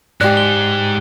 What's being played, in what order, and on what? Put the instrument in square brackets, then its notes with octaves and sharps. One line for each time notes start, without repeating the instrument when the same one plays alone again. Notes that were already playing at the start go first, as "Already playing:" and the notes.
[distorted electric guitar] G#2 [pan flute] G#3 [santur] G4 D5 [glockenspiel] F#6
[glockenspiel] G7